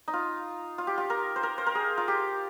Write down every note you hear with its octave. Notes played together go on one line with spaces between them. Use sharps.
D#4
F4
F4
G4
F4
A#4
C5
A#4
C5
A#4
G#4
F4
G4